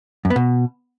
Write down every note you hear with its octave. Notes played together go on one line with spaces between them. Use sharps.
F#2
B3
B2